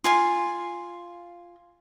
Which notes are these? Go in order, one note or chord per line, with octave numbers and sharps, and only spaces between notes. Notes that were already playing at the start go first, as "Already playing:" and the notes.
F4 G#5 C6